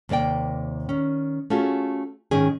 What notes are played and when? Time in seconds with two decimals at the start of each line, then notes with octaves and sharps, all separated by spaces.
0.09 D#2 C3 A#3 D5 G5
0.89 D#3 C#4
1.50 A3 C#4 F4 F#4 G#4
2.31 G#2 D#3 C#4 G#4